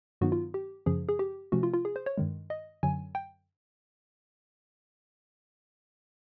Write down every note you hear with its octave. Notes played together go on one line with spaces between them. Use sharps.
G2 D#3 F#3 B3 D#4 F#4
F4
G4
F#2 C#3 F3 G#4
G#4
G4
C3 F3 A3 C#4 F#4
F4
F4
G#4
C5
C#5
G2 D#3 G#3
D#5
F#2 D3 F#3 G#5
G5